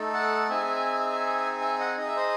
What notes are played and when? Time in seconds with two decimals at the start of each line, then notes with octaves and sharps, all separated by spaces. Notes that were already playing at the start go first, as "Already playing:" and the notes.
Already playing: A3 D#4 A4
0.14 F#5 A5
0.50 C4 D#4 G#4 E5 G#5
1.61 E5 G#5
1.79 D#5 F#5
1.98 D#4 G#4 D#5
2.07 E5
2.16 C5 D#5